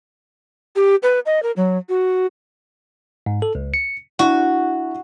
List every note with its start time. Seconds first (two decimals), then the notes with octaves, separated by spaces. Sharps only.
0.76 G4
1.03 B4
1.26 D#5
1.43 A#4
1.56 F#3
1.89 F#4
3.26 G#2
3.42 A4
3.55 C#2
3.74 C#7
4.19 D4 E4 F#4